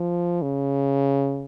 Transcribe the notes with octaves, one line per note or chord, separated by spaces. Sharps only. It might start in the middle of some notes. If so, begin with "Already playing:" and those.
Already playing: F3
C#3